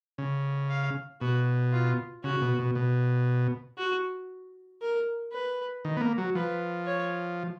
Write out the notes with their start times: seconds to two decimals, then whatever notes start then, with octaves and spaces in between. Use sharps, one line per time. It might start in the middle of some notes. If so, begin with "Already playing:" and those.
0.18 C#3
0.70 F5
1.21 B2 F#4
1.72 F4
2.24 C#3 F#4
2.41 B2
2.59 B2
2.75 B2
3.78 F#4
4.82 A#4
5.32 B4
5.85 D#3
5.97 B3
6.01 A#3
6.18 F#3
6.35 F3 B4
6.87 C#5